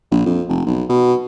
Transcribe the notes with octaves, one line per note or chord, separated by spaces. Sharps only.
A#1
F2
F1
B1
B2